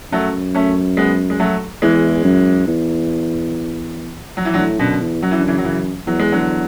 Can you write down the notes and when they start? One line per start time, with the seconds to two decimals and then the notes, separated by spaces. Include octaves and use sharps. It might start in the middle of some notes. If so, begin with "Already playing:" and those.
0.12 F#2 F#3 A3
0.55 A3 C#4
0.97 G#3 B3
1.30 G#3
1.40 F#3 A3
1.82 E2 E3 G#3
2.24 F#2
2.67 E2
4.37 F#3
4.45 E3
4.54 D3 F#3
4.58 A2
4.79 F#2 B2 D3
5.01 E2
5.22 F#2 F#3
5.31 E3
5.39 D3
5.48 C#3 E3
5.58 F#3
5.64 C#3 E3
6.07 E2 F#3
6.19 G#3
6.32 D3 F#3